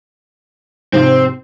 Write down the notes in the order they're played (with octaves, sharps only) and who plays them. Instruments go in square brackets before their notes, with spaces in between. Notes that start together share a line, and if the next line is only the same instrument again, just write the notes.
[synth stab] G#2 C3 F3 [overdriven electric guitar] C4